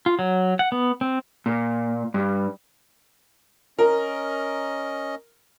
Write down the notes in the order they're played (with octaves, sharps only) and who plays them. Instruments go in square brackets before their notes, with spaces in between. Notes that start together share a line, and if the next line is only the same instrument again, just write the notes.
[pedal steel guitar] F4
F#3
F#5
B3
C4
[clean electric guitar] A#2
G2
[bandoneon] C#4 D#5 [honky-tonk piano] A#4